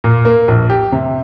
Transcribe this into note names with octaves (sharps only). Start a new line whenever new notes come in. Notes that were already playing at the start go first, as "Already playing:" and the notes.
A#2
A#3
A#1
G4
C3